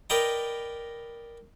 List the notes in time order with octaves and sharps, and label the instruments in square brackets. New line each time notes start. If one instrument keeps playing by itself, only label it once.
[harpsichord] A#4 B4 D5 D#5 G5 A#5